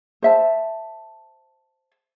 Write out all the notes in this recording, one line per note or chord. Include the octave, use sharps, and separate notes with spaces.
C5 E5 A5